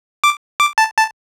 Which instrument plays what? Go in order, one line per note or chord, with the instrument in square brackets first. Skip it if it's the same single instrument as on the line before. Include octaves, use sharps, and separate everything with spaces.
[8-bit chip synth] D6
D6
A5
A5